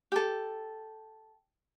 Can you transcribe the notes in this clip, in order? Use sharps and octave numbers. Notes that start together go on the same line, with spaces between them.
G4 A4